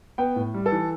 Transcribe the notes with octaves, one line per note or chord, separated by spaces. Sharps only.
B3 G5
A2
G3
A4
E3